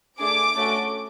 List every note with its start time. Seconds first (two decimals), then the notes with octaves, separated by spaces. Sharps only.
0.19 A3 D4 G#4 D6
0.56 A3 C#4 F#4 A4